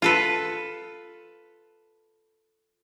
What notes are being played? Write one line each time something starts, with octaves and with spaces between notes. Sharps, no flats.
F4 A4 B4